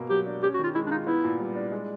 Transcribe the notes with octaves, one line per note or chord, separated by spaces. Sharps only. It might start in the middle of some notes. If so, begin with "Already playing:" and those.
Already playing: B2 A#3
F#3 G4
D4
C#4 G4
F#4
D#3 F4
G#3 E4
D4
D#4 F4
B3 E4
A#2
G3
D4
G#3